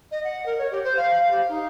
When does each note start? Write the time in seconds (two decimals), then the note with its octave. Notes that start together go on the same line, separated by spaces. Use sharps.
0.11 D#5
0.24 F#5
0.46 A#4
0.58 C#5
0.71 G4
0.84 C5
0.97 F5
1.13 F5
1.31 G4
1.48 D#4